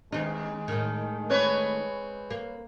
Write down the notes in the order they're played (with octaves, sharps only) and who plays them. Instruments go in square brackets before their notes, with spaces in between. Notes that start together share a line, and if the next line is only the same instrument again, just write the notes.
[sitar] D#2 [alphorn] G#3 [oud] C4 D#4
[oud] A2 D#3
[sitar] C4 B4 C#5
[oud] A#3